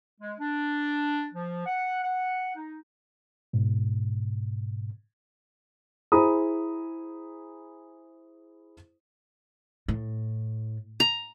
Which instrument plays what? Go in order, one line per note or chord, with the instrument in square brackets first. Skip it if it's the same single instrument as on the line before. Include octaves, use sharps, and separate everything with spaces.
[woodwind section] G#3
D4
F3
F#5
F#5
D#4
[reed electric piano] G#2 B2
[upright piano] E4 G#4 C5 A#5 B5 D#6
[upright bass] A2
[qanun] A#5